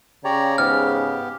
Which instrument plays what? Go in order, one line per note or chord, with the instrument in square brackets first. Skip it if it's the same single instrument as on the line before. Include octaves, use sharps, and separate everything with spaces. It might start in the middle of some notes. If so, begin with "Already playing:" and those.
[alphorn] C#3 [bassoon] G4 [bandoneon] C#5 D5 A#5
[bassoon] G#2 [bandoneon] B3 G4 [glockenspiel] F6